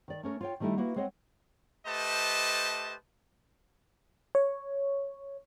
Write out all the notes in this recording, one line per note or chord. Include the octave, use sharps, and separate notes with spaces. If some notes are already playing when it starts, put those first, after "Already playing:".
D#3 D5
A3 C#4 A#4
F4 C#5 G5
D#3 G3 A3 D#4 E4
A#3 E4 F#4 B4
G#3 C4 C#5 D#5 F#5
A3 G4 B4 C5 D#5 A5
C#5